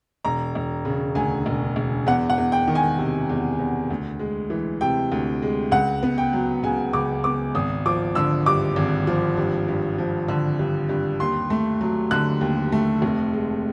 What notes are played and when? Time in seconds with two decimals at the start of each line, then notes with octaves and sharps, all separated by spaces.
0.25 E1 A#5
0.55 E1
0.85 C#3
1.15 D2 G#5
1.46 E1
1.76 E1
2.07 E2 F#5
2.30 F#5
2.38 E2
2.52 G5
2.68 D#3
2.75 G#5
2.98 C3
3.29 E2
3.59 E2
3.90 D2
4.19 G#3
4.50 E3
4.81 C3 G5
5.12 D2
5.42 G#3
5.72 C#2 F#5
6.03 B3
6.18 G5
6.33 F#3
6.63 C#3 G#5
6.93 C#2 D6
7.24 B3 D6
7.55 G#1 D#6
7.86 F3 D6
8.15 D3 E6
8.46 G2 D6
8.76 G#1
9.07 F3
9.37 G2
9.68 G2
9.98 F3
10.28 D3
10.59 G2
10.89 G2
11.20 D#2 C6
11.50 A3
11.81 F#3
12.11 D3 F#6
12.41 D#2
12.72 A3
13.02 F1
13.33 G#3